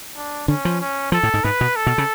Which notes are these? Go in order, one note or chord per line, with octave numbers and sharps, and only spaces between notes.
D4
D3 C#4
F3
C#4
F3 A4
A2
G#2
G#2 B4
B2
A4
B2
C#3